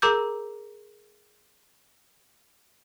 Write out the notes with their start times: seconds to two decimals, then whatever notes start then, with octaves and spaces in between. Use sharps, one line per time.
0.02 G#4 A#4 A#5 D6 E6 G6